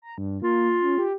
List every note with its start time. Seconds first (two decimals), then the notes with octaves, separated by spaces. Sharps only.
0.02 A#5
0.18 G2
0.42 A#3 F4
0.82 C#4
0.98 G4